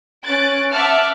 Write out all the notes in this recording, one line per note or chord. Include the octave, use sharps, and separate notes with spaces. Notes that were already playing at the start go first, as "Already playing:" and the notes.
C#4 F#6 A6 D7
E5 F#5 A5 D6 F6